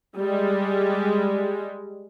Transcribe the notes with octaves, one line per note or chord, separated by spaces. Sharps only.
G3 G#3